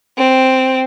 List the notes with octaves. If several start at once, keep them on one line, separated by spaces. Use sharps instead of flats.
C4